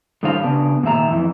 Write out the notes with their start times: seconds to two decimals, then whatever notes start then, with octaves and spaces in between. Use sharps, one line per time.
0.23 A2 D3 D#3 G3 C5 F5
0.43 C#3 B3 D4
0.83 A#2 D#3 E5 A#5
1.10 F2 E3